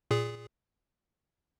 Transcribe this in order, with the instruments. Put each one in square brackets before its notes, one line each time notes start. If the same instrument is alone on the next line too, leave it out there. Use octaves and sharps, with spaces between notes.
[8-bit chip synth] A#2 G#4